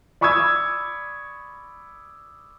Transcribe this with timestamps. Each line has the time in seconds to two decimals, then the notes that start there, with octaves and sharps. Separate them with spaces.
0.21 D5 B5 C#6 D#6 E6 G#6